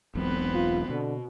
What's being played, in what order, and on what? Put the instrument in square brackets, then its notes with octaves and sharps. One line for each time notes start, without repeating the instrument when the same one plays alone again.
[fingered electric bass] E1 B1 [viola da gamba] B3 C4 B4
[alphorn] F4
[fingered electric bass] B2 [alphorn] D3